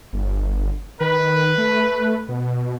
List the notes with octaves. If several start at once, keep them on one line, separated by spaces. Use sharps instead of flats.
G1
D#3 B4
A3
B2